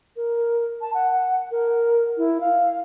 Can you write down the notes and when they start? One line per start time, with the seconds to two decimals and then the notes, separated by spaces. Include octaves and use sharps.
0.16 A#4
0.81 A5
0.94 F#5
1.51 A#4
2.17 E4
2.41 F5